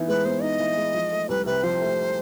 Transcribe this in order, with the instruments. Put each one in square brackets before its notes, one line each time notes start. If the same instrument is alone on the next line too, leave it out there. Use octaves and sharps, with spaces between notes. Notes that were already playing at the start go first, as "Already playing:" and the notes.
Already playing: [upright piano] E3 B3 D#4
[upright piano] G#3 [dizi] B4
[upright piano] B3 [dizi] C5
[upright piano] D#4 [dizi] D#5
[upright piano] E3
G#3
F3
A3
[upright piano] C2 [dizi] B4
[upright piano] C3 [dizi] B4
[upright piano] F3 [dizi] C5
[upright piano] A3